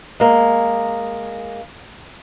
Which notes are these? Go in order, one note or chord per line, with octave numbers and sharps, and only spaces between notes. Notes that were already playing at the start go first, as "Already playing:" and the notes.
G#3 A#3